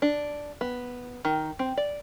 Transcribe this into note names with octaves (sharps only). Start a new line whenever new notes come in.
D4
B3
D#3
C4
D5